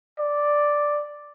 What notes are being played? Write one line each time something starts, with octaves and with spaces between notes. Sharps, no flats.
D5